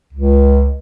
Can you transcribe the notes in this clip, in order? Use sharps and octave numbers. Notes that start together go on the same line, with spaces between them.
C#2